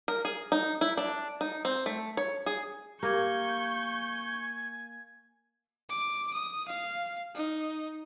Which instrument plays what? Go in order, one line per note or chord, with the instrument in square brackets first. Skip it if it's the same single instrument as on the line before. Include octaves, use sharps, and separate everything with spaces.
[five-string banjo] A#4
G#4
D#4
E4
D4
D#4
C4
A3
C#5
G#4
[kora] A#3 [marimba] G4 A#4 G#6 [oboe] G#5 [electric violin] C#6 G6
[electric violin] D6
D#6
F5
D#4